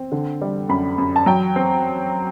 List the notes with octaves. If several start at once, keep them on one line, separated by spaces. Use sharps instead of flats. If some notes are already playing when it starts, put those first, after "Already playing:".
Already playing: C4
D3
G3
F#2 B5
F#2
A5
F#3 G5
C4